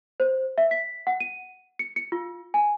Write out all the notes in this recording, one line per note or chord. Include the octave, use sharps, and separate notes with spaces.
C5
E5
B6
F#5
D#7
C#7
C#7
F4
G#5